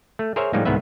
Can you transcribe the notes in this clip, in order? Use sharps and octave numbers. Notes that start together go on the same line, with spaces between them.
A3
G#4 A#4 C5 C#5 E5
A2 F3 G3 G#3 A#3 D#4
C2 G#2 D#3 B3 B4 E5